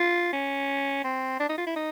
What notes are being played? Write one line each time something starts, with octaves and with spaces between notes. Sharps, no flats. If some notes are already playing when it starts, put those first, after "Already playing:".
Already playing: F4
C#4
C4
D4
D#4
F4
E4
D#4